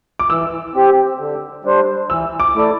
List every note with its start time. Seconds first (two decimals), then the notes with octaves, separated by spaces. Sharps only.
0.19 D6
0.29 E3 E6
0.75 C4 G4
1.19 D3
1.65 G3 D4 C5
2.10 E3 E6
2.40 D6
2.54 A3 E4 A4 D5